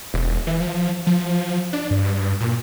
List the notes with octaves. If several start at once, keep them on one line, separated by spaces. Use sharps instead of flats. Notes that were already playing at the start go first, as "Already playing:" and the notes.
E1
E3
F3
F3
D4
G2
A#2